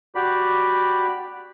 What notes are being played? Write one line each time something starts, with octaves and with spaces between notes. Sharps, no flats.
F#4 G4 D5 B5